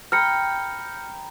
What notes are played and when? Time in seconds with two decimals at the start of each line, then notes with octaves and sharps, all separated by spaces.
0.12 G5 A#5 B5 F6 C#7